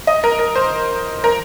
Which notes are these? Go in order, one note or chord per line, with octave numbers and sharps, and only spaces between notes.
D#5
A#4
A#4
C5
A#4